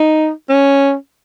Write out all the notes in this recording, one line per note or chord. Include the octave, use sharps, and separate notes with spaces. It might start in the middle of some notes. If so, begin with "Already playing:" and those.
Already playing: D#4
C#4